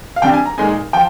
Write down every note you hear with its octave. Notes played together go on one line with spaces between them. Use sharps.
F5
C3 G3 D4 G5
G#5
A#5
A#2 G#3 D#4 G#5
F3 G5